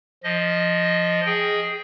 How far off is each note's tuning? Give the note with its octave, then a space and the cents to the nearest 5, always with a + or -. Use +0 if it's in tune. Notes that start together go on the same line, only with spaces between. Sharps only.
F3 +0 D#5 +0
G#4 +0 G5 +0